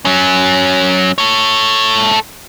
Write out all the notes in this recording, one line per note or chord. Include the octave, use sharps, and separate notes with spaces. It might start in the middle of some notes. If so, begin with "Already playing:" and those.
F#3 C#4
A4 C#5